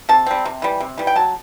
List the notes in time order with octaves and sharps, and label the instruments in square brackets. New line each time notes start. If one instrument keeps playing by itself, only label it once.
[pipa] C3 A5
G3 C4
C3
E3 G3
C3
E3 G3
G5
F#3 A5